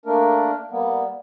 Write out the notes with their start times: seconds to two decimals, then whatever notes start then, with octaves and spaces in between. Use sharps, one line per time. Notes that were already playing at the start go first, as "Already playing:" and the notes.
0.06 A3 A#3 D4 A#4
0.71 G3 A#3 B3